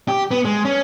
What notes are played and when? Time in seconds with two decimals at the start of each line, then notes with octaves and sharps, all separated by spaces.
0.08 G4
0.31 B3
0.45 G#3
0.65 C#4